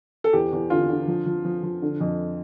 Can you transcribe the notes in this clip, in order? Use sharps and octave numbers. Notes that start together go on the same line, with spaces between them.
A4
E2 G4
E2
D3 F4
D3
F3
F3
F3
F3
D3
F2